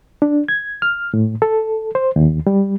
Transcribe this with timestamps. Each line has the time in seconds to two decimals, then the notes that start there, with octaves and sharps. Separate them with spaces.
0.22 D4
0.48 G#6
0.82 F6
1.14 A2
1.42 A4
1.95 C5
2.16 D#2
2.47 G3